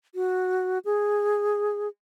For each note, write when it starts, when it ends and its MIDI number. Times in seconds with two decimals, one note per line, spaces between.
0.15 0.79 66
0.85 1.88 68